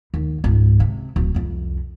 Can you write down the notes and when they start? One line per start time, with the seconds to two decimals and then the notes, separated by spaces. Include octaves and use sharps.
0.14 D#2
0.44 C#2 G#2
0.80 C3
1.16 D1
1.35 C2 F2